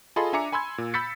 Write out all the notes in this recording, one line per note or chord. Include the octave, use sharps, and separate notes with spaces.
F4 G#4 A4 D#5 B5 C6
D4 E5 G#5 A#5 D6 C#7
G#5 B5 C6 E6 G#6
A#2
B5 E6 G6 A6 B6 C#7